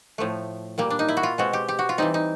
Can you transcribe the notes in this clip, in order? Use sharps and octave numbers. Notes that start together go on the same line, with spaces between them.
A2 F3 A3
A#2 G3 A#3
D4
D#4
E4
F#4
F4
B2 G#3 C4 F#4
G4
G4
F#4
F4
E3 G3 C4 D#4
D#4